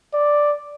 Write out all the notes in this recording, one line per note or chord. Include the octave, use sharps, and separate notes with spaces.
D5